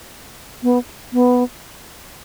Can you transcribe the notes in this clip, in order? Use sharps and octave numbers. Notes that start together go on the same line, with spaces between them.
B3
B3